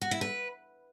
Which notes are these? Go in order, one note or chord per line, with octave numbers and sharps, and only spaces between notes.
F#4
E4
B4